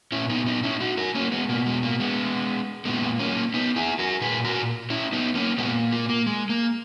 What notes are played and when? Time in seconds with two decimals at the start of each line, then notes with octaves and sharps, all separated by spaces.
0.12 A#2 C#4 E4
0.30 B3 D#4
0.46 B3 D#4
0.64 C#4 E4
0.80 D#4 F#4
0.97 F#4 A#4
1.15 A#3 C#4
1.32 G#3 B3
1.49 B2 A#3
1.66 G#3
1.83 A#3
2.00 G#3 B3
2.85 A#2 G#3 B3
3.19 A#3 C#4
3.54 B3 D#4
3.76 E4 G#4
3.99 F#4 A#4
4.21 A#2 G#4 B4
4.45 F#4 A#4
4.90 C#4 E4
5.13 B3 D#4
5.35 A#3 C#4
5.58 A#2 G#3 B3
5.92 A#3
6.09 A#3
6.27 G#3
6.49 A#3